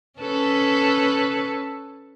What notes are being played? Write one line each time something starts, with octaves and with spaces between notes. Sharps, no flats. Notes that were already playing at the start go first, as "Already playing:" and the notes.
C#4 A4 B4